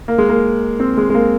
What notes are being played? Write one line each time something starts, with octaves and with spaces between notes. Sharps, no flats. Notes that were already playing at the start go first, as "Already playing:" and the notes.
A#3
G#3
A#3
C4
G#3
G#3
A#3